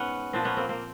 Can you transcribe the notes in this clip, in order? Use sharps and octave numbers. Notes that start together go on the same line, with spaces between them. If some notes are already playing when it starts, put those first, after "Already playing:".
Already playing: G#2 B3 C#4
A#2 F3 C4 D4
B3 C#4
A#3 C4
A#3 C4